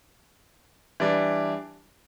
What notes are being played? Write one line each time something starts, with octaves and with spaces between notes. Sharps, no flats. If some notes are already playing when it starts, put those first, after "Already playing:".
E3 G3 D4